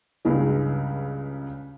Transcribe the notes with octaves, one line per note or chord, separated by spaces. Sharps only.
C#2 G2 C#3 G#3